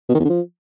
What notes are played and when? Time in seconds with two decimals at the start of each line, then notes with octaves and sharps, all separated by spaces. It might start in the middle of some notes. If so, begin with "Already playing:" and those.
0.09 B2
0.14 D#3
0.20 E2
0.25 D3
0.30 F3